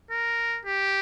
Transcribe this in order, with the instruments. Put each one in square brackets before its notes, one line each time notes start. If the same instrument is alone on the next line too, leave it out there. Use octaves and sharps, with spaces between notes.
[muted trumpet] A#4
G4